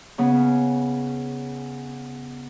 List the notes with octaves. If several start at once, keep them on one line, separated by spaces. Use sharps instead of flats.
C#3 B3 C#4